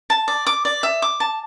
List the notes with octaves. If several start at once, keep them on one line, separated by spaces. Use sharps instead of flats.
A5
D5
D6
D5
E5
D6
A5